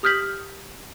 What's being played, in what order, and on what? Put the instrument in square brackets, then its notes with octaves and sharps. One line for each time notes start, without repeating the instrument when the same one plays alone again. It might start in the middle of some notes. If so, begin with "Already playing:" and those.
[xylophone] G4 D#6 F6 G6 B6 F#7